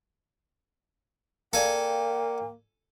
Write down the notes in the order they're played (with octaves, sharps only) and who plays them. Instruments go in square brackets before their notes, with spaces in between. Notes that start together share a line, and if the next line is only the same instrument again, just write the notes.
[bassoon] A#3 [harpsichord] A4 G#5 [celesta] D5 F5 [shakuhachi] G5